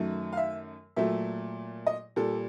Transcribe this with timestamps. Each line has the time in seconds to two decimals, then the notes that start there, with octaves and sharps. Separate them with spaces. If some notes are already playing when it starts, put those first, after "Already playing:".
Already playing: F#2 D#3 F#3 A3
0.33 F5
0.37 E5
0.96 A#2 F#3 A3 E5
1.87 D#5
2.16 A#2 G3 A4